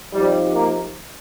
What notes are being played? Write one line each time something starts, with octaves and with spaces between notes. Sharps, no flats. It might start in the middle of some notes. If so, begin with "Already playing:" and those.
F3 G3 C4 D#4 G4
A#3